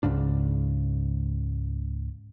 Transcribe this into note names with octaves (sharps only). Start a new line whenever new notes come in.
C#2 G#2 C#3 D4